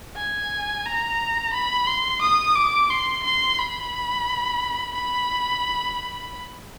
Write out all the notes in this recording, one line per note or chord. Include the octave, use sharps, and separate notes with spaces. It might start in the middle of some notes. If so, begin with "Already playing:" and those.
G#5
A#5
B5
C6
D#6
D6
C6
C6
B5
B5